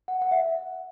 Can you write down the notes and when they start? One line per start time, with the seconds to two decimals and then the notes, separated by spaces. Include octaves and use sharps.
0.08 F#5
0.22 F#5
0.31 E5